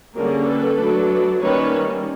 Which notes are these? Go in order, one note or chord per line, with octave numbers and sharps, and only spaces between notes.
D3 G3 A#3 C#4 G#4 A#4
A4 B4
F#3 A3 D4
D#3 G3 A#3 C#4 B4 C#5